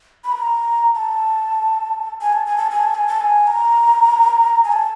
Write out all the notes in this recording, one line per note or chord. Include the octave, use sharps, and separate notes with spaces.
B5
A#5
A5
G#5
A5
G#5
A5
G#5
A5
G#5
A5
G#5
A#5
G#5
A5